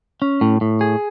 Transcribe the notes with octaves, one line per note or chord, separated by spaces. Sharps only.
C#4
A2
A2
G#4